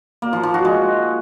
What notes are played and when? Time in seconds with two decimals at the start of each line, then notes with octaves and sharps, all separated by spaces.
0.22 A#3
0.33 F3
0.43 F3
0.54 F#4
0.65 G#3